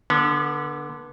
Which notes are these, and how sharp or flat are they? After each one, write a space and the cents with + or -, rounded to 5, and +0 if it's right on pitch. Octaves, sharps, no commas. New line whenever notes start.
D3 +0 B3 -35